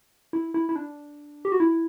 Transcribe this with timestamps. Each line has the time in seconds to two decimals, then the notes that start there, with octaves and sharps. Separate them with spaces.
0.33 E4
0.54 E4
0.69 E4
0.76 D4
1.45 G4
1.52 F#4
1.60 E4